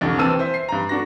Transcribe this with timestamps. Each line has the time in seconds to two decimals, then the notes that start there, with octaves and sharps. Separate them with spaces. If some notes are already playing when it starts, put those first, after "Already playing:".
0.01 C2 F2 D3
0.18 D#2 E3 C4 A5 E6 D#7
0.39 C5 E5
0.54 C7
0.69 G2 A#5
0.89 A3 D4 F#4 A#6